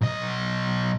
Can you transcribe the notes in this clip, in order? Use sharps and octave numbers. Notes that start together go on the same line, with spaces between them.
B1 D#5